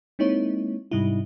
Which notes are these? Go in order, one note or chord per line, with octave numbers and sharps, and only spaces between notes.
G#3 A#3 C4 D#4 E4 C#5
G#2 C3 G3 D#4 E4